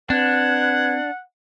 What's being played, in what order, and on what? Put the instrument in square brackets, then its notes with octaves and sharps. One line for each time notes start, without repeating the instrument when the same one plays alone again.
[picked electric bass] C4 [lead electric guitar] D4 [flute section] B4 G6 G#6 [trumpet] F#5